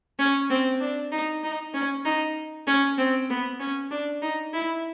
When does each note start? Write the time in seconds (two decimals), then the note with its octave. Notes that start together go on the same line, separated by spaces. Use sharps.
0.19 C#4
0.50 C4
0.80 D4
1.11 D#4
1.43 D#4
1.74 C#4
2.05 D#4
2.67 C#4
2.98 C4
3.30 B3
3.60 C#4
3.91 D4
4.22 D#4
4.53 E4